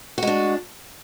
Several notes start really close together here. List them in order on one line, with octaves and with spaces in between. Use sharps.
F#4 G#3 D4